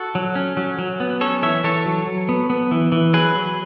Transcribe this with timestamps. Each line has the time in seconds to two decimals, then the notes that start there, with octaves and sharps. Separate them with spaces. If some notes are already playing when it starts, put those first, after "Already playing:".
Already playing: F#4 A4
0.15 F#3
0.35 C#4
0.57 F#3
0.79 F#3
1.00 B3
1.21 C#4 A4 C#5
1.42 E3 C#5 E5
1.64 E3 A4 C#5
1.86 F#3
2.07 F#3
2.29 B3
2.50 B3
2.71 E3
2.92 E3
3.13 F#3 G#4 B4
3.35 F#3